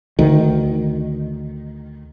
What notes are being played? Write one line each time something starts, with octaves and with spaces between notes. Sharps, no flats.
D2 D#3